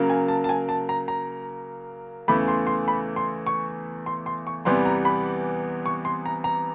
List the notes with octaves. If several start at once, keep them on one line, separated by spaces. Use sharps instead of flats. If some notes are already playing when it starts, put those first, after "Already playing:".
Already playing: C#3 F#3 A#3
G#5
A5
A5
G#5
A5
A#5
A#5
E2 C#3 E3 A3 B5
C6
C6
B5
C6
C#6
C6
C6
C#6
E2 C3 E3 G3 B3 C6
A#5
B5
C#6
C6
A#5
A#5